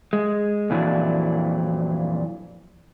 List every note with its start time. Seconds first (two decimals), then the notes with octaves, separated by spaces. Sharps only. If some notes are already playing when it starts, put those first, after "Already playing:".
0.13 G#3
0.70 F2 A#2 E3 F#3 D4